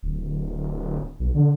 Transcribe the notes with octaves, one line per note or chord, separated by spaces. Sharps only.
D1
B1
D3